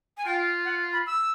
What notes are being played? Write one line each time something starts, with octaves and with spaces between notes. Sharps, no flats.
G#5
F4 G5
F#5
B5
E6